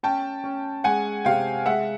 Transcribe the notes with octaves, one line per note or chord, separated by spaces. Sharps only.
C#4 G5 A5
C#4
G#3 F#5 G#5
C3 F5 G5
G#3 E5 F#5